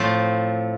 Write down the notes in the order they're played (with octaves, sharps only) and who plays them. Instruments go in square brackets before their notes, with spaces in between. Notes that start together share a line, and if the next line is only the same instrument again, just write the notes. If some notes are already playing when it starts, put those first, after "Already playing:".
Already playing: [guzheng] A2 F3 A3 C4